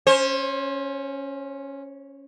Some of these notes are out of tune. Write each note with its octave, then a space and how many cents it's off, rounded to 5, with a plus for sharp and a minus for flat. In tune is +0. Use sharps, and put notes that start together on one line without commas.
C#4 +0 C5 +30